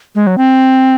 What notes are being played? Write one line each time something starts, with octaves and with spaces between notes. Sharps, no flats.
G#3
F#3
C4